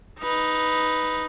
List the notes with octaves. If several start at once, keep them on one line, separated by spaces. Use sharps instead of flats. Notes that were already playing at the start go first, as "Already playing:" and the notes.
D#4 B4